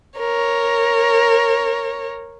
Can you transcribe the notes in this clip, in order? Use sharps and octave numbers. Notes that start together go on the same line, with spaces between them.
A#4 C#5